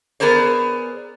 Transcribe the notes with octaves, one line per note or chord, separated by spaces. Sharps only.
B3 G#4 A#4 C5 D5